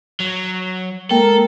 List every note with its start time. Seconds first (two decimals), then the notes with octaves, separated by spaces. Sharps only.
0.20 F#3
1.11 G#3 A#3 A4 A#4 G5